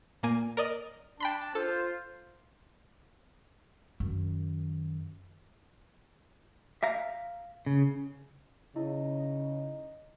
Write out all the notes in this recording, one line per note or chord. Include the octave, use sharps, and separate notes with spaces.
A#2 A#3 G#5
A#4 D5 D#5
D4 G5 A5 B5 C6
F4 A4 C5
F#2 D#3
E5 F5 A#5
C#3
C#3 D#4 E4